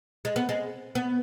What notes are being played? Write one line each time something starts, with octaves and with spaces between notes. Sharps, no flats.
G#3
B3
G#3
B3